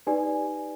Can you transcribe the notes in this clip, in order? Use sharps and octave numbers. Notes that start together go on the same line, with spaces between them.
D#4 G4 B4 D5 G#5